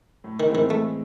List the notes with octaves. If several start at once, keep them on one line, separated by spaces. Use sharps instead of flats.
A2
D#3
E3 G#3 C4 E4
D#3
A2 A3